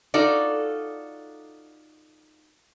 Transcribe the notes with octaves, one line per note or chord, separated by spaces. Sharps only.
D#4 F4 F#4 A4 D5